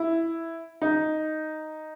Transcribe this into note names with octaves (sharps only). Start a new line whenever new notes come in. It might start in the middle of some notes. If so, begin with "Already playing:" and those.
Already playing: E4
D#4